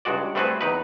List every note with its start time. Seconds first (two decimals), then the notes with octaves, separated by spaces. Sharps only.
0.05 C#2 G2 G#3 F#4 D5
0.35 G3 A3 C4 F#4 G#4 B4
0.61 E2 D#4 B4